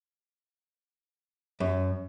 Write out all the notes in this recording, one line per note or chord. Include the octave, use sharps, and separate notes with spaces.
F#2